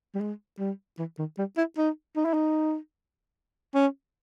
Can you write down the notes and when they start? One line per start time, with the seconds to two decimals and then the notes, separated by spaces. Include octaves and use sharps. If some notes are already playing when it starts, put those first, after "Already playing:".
0.15 G3
0.20 G#3
0.59 G3
0.99 E3
1.19 D#3
1.38 G3
1.57 E4
1.78 D#4
2.16 D#4
2.25 E4
2.34 D#4
3.74 C#4